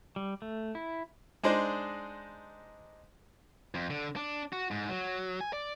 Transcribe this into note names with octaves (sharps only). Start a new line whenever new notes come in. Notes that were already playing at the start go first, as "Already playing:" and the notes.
G3
A3
E4
G#3 D4 D#4 C5 D5
F2
D3
D4
F#4
G#2
F#3
G#5
D5